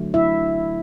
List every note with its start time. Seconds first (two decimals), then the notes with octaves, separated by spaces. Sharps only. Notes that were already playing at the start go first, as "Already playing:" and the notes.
Already playing: D3 F#3 A3
0.14 E4 E5